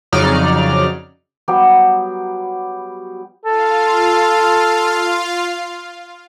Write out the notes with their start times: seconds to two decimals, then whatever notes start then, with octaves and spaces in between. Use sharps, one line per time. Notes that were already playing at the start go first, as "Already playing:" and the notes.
0.12 F2 C#3 F#3 D#4 D5 F6
1.48 F#3 G3 B3 G4
3.45 F4 A4 F5